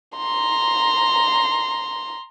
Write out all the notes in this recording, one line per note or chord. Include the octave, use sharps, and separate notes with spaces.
A#5 C6